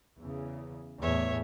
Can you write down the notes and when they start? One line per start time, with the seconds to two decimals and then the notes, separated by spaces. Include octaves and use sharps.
0.18 E2 C#3
1.02 E2 A2 C#5 E5